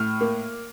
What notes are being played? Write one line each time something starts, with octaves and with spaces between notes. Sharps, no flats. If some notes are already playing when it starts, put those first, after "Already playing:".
Already playing: A2 F6
A#3